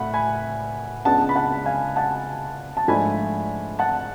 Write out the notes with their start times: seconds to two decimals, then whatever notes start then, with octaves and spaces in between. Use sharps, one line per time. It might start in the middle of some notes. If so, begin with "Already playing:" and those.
Already playing: A2 A3 F#5 B5
0.14 G#5 B5
1.05 C#2 C#3 G#3 B3 D4 F#5 A5
1.29 B5
1.36 F#5 A5
1.66 F5 G#5
1.96 F#5 A5
2.77 A5
2.88 G#2 F3 A3 D4 G#5 B5
3.79 F#5 A5